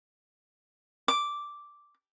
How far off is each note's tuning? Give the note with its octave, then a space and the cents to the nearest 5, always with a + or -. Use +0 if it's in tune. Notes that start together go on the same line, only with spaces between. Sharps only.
D6 -5